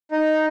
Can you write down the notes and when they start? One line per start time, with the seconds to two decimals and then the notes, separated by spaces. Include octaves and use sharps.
0.12 D#4